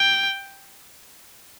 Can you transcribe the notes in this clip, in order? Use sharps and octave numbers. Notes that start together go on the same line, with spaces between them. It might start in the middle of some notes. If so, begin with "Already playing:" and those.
Already playing: G5